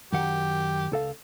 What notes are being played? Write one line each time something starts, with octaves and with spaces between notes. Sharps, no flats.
F#2 D#3 G4 F#5
C#2 A4 F5